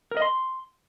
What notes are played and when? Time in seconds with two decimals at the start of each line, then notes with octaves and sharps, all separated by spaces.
0.11 A#4
0.17 D#5
0.22 C6